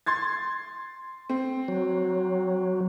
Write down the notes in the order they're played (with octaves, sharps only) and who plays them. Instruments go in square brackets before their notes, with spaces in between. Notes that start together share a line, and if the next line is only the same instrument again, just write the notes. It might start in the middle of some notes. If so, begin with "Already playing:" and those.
[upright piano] C6 G#6 A6
C4
[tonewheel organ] F#3